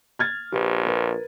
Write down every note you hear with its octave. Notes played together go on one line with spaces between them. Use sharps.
F6 G#6 A6
A#1 G4 B4
A#4 B4